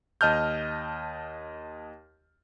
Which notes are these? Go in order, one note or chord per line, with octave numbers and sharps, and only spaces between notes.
D#2 D#5 A5 F6 G6